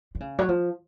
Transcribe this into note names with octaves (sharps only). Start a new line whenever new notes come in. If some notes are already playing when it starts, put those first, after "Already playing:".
D3
C#3
F#3
F3